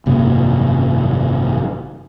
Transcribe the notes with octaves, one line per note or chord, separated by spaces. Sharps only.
G#1 F#2 C3 A#3